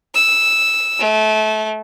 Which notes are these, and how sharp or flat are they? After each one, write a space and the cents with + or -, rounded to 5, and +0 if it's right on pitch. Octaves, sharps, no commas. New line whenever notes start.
E6 -5
A3 -25